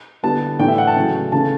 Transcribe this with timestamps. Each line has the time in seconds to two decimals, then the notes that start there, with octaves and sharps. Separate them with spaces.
0.23 D3 G3 B3 E4 A5
0.59 A2 E3 B3 D4 G5
0.68 E5
0.78 F#5
0.87 A5
0.96 C#3 F#3 A3 C#4
1.32 C#3 E3 A3 C#4 A5